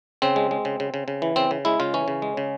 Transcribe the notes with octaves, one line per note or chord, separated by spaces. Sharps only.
C#3 C4
G#3
G#3
C#3
C#3
C#3
C#3
E3
C#3 C4
C#3
G#3 E4
C#3 F4
E3 C#4
C#3
G#3
C#3